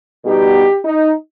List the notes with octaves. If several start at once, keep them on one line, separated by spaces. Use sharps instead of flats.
B2 G3 B3 D#4 G4
D#4